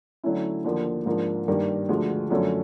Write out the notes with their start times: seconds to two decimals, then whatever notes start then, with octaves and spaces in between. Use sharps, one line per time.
0.24 D3 F#3 A3 C#4 E4
0.64 D#2 D3 F3 A#3
1.06 G#2 F3 A#3 D4
1.48 G2 D#3 G3 A#3
1.89 D2 D3 F3 G#3
2.30 F#2 D3 F3 A3 C#4